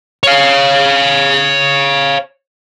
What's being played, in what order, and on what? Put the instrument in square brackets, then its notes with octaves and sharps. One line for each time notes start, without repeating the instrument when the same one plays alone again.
[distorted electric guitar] C#5 F5